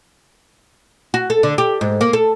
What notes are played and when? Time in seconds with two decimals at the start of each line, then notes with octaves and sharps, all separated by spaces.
1.14 F#4
1.30 A4
1.43 D3
1.58 G4
1.81 G#2
2.01 A#3
2.13 A4